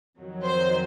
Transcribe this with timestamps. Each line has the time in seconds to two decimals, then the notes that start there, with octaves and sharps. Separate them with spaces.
0.17 F2 D#3 F#3
0.46 C5